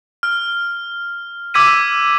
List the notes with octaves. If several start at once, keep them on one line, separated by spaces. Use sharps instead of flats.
F6
D6 E6 G#6 B6 D#7